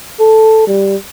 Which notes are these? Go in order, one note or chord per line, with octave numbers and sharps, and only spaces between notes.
A4
G3